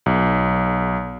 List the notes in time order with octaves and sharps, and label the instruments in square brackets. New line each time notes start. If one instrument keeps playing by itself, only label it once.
[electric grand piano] B1